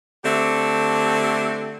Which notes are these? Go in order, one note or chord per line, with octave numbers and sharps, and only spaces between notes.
D3 A3 C4 G4